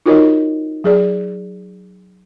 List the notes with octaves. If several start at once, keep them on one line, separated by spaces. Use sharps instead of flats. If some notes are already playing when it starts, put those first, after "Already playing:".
D#4 F4 F#4 A#4 C#5 D#5
F#3 G#4 D5